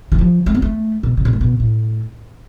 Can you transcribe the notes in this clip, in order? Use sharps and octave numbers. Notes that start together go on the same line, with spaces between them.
E3
F3
A3
B3
A3
B2
C3
B2
A2
B2
A2